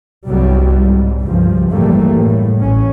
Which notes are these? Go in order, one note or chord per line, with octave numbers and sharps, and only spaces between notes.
C2 G2 F#3 G3
G#2
C#2 G2 F3
F#1 A2 E3 G3 A3 A#3
A2
A1 C#4